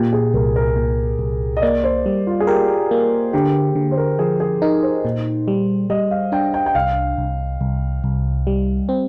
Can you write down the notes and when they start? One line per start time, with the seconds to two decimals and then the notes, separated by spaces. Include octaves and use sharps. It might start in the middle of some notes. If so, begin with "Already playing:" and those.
Already playing: A#2 G4
0.13 G#4
0.34 C2 A#4
0.56 A#4
0.76 A#2
1.19 C2
1.57 D#5
1.62 A#3 D5
1.84 C5
2.06 G3
2.27 F4
2.40 G#4
2.47 G4 A#4
2.91 A#3
3.33 D3 G4
3.75 D3
3.91 C5
3.97 A#4
4.19 F3 G#4
4.40 G#4
4.62 D#4 A#4
4.83 C5
5.05 A#2
5.48 G3
5.90 G3 D#5
6.11 F5
6.32 D4 G5
6.54 G5
6.66 G5
6.75 C2 F5
7.18 C2
7.61 C2
8.04 C2
8.47 G3
8.89 C4